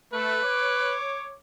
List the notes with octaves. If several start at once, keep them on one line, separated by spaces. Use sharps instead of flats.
A3 B4
C#5 D6